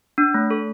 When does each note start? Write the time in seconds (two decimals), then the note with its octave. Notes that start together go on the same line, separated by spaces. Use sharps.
0.18 D4
0.34 A3
0.50 A4